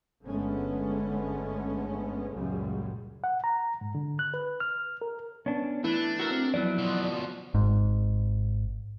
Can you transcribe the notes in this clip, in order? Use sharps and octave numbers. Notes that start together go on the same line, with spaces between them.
G1 D3 G#3 A3 B3 C#4
C#2 F#2 A#2 C#3 G3 G#3
F#5
A#5
G#2
D3
F#6
B4
F6
A#4
B3 C#4 D4
E3 A3 D4 E4 B4
F#4 A#4 E6
C4
F2 E3 F#3 B3 D5
B2 F3 F#6
G#1 G#2